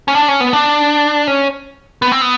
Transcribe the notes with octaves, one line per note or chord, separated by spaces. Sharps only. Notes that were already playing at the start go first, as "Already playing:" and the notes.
C#4
D4
C#4
B3
D4
C#4
B3
C4
B3